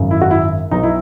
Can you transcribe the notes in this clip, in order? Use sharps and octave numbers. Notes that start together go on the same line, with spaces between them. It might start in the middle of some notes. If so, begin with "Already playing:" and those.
Already playing: G#1 F#2 C#3
E4
F#4
E4
B1 B2 D#4
E4